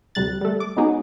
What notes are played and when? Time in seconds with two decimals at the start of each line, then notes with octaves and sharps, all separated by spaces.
0.15 D2 C3 G3 F#6 A6
0.41 G3 A3
0.60 D6
0.77 G#3 B3 C#4 D#4 F#4 G#4